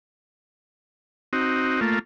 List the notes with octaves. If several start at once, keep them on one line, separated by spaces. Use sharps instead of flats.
C4 D#4 F#4
A3 A#3 F4